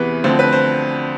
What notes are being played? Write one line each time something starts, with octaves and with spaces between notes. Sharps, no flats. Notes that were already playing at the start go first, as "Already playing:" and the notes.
Already playing: E2 C3 E3 B3 B4
D2 D3 F3 C4 C5
B4
C5